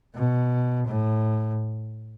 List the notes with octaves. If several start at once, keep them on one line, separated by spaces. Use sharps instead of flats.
B2
A2